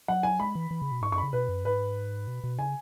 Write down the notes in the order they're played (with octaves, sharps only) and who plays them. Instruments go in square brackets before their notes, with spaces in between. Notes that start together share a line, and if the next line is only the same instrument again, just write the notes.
[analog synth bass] F#3 [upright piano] F#5
[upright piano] G#5
[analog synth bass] G#3 [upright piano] B5
[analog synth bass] E3
E3
C#3
B2
[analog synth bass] G#2 [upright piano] C#6
[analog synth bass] F#2 [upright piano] C#6
[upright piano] B5
[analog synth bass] C#3
[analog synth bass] B2 [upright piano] B4
[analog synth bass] F#2
[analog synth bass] G#2 [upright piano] B4
[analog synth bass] B2
B2
[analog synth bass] C#3 [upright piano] G#5